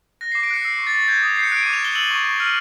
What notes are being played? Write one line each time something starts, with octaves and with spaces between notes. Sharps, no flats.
F#6 A#6
C7
D6
D7
F#6 C#7
E6 C7
C#6
A6
C#6
G6 G#6
D#6
G6 C7
C#7
F#6 D7
D#7
D6
F7
F#6 G7
E6 F#7
C#6
C#6
F6